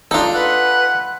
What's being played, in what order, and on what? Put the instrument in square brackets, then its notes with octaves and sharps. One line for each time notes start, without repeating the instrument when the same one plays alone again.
[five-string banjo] D4 D#4 [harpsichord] F4 A4
[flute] B4 [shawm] F#5